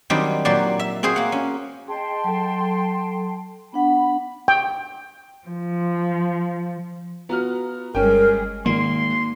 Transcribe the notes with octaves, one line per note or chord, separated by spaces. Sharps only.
D#3 F#3 G3 C4 D4
A#2 F#3 F#4 G4 C5 D5
E5
C4 F#4 G#4 C5
A#3 F#5
C#4
G#4 D#5 G5 A5 C6
F#3 A4
B3 D4 F#5 B5
G5
F3
B3 F4 F#4 A#5 F6
G1 G3 G#3 C#4 G#4 A#4 G5
G#1 A#3 C6